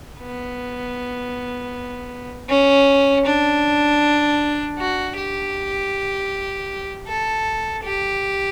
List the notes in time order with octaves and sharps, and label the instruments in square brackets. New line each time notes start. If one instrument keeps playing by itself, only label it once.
[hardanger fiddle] B3
C#4
D4
F#4
G4
A4
G4